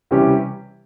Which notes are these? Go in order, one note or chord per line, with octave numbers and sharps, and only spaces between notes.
C3 E3 G3 C#4 G4